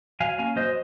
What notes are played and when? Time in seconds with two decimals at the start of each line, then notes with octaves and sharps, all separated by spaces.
0.20 F#3 F5 G#5
0.38 A#3 C#4 F5 G#5
0.56 F#3 C5 D#5